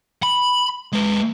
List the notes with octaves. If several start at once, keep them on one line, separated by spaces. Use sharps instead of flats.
B5
G#3 B4